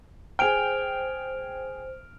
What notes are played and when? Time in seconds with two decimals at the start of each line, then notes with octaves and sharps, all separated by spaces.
0.39 G#4 C5 G5 F6 D7 F7